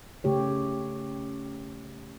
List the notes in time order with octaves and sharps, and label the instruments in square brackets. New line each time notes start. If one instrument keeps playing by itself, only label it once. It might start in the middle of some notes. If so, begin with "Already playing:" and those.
[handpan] C#3 A3 G4 C#5